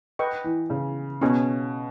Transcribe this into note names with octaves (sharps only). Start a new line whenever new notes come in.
B4 D#5 G5 C#6
E3
C#3
B2 C#4 G#4 C#5